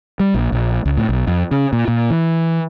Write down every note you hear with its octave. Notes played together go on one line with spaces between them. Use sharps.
G3
A#1
A#1
C#2
A2
B1
F2
C#3
A#2
A#2
E3